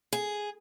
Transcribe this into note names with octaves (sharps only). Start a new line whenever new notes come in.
G#4